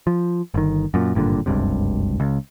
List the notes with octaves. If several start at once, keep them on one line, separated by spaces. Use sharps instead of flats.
F3
G1 D#3
F#2 A#2
G#1 G2 A#2 D3
F#1 C#2 G2 C3
C#2